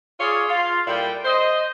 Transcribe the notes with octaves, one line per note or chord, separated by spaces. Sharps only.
F4 G#4 C#5 D5 F5
F4 F5
A#2 G3 E4 A4 D5 G5
C5 D#5